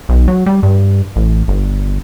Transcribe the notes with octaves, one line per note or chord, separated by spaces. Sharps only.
B1
F#3
G3
G2
A1
G1